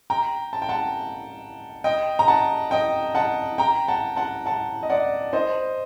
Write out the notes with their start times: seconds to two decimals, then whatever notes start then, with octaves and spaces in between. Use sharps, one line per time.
0.10 G5 A#5
0.53 A5
0.62 G5
0.69 F#5 A5
1.84 D#5 G5
2.19 A#5
2.28 F#5 A5
2.71 D#5 G5
3.15 F#5 A5
3.58 G5 A#5
3.88 F#5 A5
4.17 F#5 A5
4.46 F#5 A5
4.83 D#5
4.90 D5 F#5
5.33 C5 D#5